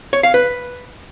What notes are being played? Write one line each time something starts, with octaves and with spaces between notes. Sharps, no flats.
C#5
F5
B4